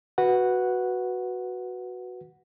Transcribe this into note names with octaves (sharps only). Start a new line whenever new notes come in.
F#4 B4 F#5